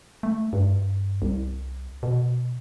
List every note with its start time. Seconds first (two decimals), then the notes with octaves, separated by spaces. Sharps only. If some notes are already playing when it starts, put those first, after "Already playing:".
0.23 A3
0.53 G2
1.22 C2
2.03 B2